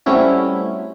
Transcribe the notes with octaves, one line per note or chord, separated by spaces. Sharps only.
G3 A3 C4 C#4 E4 F#4